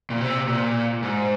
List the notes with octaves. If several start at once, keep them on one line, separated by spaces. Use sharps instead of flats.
A#2
C3
A#2
G#2